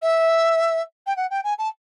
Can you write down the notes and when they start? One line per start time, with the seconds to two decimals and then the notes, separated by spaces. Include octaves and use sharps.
0.02 E5
1.06 G5
1.16 F#5
1.30 G5
1.43 G#5
1.58 A5